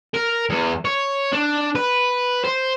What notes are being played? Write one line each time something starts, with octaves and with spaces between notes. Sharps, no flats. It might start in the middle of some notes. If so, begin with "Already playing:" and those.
A#4
E2
C#5
D4
B4
C5